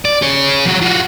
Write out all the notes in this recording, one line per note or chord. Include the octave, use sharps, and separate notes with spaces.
D5
G#4 C#5
F3 F#4
F4 F#4